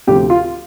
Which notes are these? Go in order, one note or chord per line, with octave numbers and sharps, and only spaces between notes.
D2 C3 F3 G4
F4